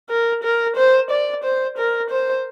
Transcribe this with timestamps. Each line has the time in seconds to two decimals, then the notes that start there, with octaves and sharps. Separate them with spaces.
0.10 A#4
0.44 A#4
0.76 C5
1.11 D5
1.44 C5
1.78 A#4
2.10 C5